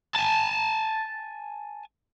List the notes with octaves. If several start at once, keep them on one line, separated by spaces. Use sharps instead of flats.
G#5 A5